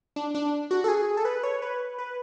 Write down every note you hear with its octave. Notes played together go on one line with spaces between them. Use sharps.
D4
D4
F#4
A4
G#4
A4
B4
C#5
B4
B4